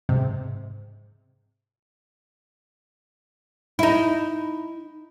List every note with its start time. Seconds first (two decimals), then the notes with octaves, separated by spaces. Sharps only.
0.09 G#2 C3
3.79 D#4 E4